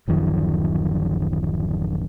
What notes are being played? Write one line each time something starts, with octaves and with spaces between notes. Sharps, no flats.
D1 F#2 D#3 F3